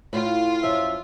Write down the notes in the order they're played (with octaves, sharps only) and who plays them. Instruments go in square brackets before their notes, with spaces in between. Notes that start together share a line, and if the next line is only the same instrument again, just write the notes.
[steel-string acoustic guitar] A2 [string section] F4
[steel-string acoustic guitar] F#2 F3 [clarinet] E5